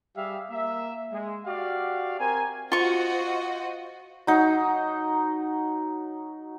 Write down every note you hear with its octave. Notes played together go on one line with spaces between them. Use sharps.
G3 G4 G#4 E5 F5
A#3 E5
G#3
F#4 G4 D5 F5
C4 A#4 G#5
F4 F#4 C5 D#5 C#6
F#3 D#4